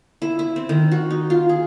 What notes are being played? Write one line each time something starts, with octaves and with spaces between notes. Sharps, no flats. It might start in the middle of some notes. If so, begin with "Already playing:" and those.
E4
E4
C4
D#3
F#4
D#4
F4
G#4